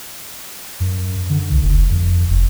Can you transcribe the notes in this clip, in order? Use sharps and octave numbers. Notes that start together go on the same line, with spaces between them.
F#2
D3
C2
F1
F2
F1